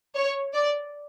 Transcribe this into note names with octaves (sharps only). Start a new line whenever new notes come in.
C#5
D5